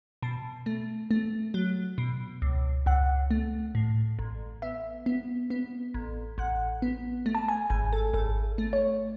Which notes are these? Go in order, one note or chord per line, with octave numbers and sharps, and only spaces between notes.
B2 A5
A3
A3
F#3
B2
C#2
C#2 F#5
A3
A2
A1
B3 E5
B3
B3
A1
A1 F#5
B3
A3
A5
G#5
G#1 G#5
A4
G#1 A4
A3
C#5